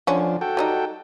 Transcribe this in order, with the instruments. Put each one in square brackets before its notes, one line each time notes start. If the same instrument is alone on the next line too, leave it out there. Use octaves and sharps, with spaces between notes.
[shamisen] D3 C#4 [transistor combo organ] F3 D4
[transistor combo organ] F#4 A4 G5
[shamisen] F#3 G3 D#4